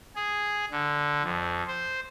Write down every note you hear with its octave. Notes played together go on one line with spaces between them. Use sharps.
G#4
D3
F2
C5